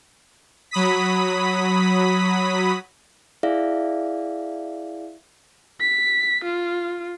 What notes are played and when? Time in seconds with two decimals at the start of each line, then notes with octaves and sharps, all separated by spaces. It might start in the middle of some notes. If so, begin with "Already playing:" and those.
0.71 F#3 B5 D#6 B6
3.43 E4 G#4 D5 E5 F5
5.81 B6
6.44 F4